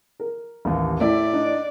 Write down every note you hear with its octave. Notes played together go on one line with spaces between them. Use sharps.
A#4
A1 D#2
A2 D5 E5
D4 D#4